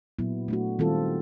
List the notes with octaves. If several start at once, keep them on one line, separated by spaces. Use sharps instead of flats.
A#2 F#3 B3 E4
A3 D4 F#4
D#3 G3 C4 F4 A4